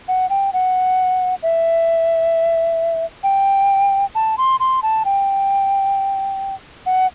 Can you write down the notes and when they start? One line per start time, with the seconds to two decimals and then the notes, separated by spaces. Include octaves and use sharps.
0.08 F#5
0.30 G5
0.53 F#5
1.43 E5
3.23 G5
4.15 A5
4.38 C6
4.60 C6
4.83 A5
5.05 G5
6.86 F#5